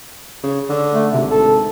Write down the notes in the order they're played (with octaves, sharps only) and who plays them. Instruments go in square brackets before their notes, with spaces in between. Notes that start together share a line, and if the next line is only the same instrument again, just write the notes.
[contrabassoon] C#3
D3
[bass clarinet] A3
[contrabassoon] G#1 [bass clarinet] C3
[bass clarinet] A4